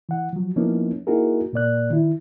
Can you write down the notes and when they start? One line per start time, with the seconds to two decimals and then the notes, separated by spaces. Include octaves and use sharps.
0.09 E3 F#5
0.33 F3 F#3
0.56 F3 A#3 B3 C#4 D#4 E4
1.07 A#3 D#4 E4 F#4 G#4 A#4
1.53 A#2 A#3 D5 F#6
1.90 D#3 E4